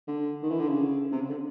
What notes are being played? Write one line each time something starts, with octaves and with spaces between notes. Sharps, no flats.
D3
D#3
E3
D3
C#3
C3
C#3
D3